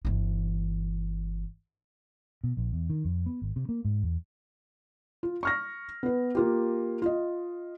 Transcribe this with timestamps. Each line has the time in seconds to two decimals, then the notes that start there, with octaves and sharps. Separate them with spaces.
0.05 G1 E3
2.44 B2
2.57 A#1
2.73 E2
2.90 D#3
3.05 F2
3.26 B3
3.42 G#1
3.56 C3
3.69 A#3
3.85 G#2
4.03 E2
5.23 F4
5.43 C#6 F6 A#6
6.03 B3 B4
6.35 A#3 F4 G4
7.02 F4 D#5